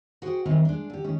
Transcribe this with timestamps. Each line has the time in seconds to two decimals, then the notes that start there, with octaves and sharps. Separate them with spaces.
0.22 F#4 G#4 C5 F#5 G5
0.45 D#3 E3 G3 C4
0.65 G#3 D4
0.90 D3 G4
1.04 D#3 G#3 C#4